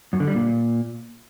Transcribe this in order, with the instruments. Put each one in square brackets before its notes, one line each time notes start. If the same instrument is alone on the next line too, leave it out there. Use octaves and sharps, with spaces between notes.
[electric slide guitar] F#2
D3
G3
A#2